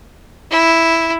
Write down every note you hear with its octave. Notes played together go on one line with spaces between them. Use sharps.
E4